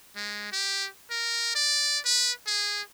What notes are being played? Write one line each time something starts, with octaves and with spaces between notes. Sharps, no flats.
G#3
G4
A#4
D5
B4
G#4